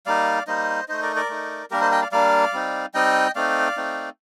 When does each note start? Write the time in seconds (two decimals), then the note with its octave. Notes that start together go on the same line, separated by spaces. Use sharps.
0.06 G3 A#3 D#4 D5 F5
0.47 G3 A#3 D#4 C5 D#5
0.88 A3 D#4 C5 D#5
1.02 A#4 D5
1.16 A#4 D5
1.30 A3 D#4
1.71 G3 A#3 D4 G4 A#4
1.81 C5 D#5
1.91 D#5 G5
2.02 D5 F5
2.12 G3 A#3 D4 D5 F5
2.53 G3 C4 D#4
2.94 G3 C4 D#4 D#5 G5
3.35 A3 C4 D#4 D5 F5
3.77 A3 C4 D#4